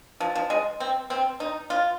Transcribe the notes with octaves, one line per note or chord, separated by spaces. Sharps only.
F3
F3
G#3
C4
C4
D#4
F4